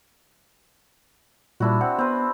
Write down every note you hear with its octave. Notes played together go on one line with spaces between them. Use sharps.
A#2 G3 D4 E4 F#4
C4 F#5
B3 C4 B4